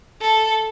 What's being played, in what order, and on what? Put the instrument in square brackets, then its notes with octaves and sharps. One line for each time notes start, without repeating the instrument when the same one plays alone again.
[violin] A4